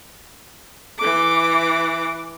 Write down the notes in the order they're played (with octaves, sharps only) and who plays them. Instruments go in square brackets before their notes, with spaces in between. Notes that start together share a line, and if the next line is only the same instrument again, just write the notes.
[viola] E3 D6